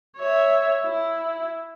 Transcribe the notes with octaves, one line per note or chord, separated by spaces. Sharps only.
C#5 E5
E4